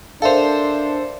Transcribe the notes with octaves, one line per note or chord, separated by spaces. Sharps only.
D4 A4 A#4 C5 E5 F5